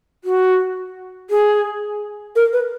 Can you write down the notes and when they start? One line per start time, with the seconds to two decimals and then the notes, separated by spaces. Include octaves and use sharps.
0.24 F#4
1.30 G#4
2.36 A#4
2.53 B4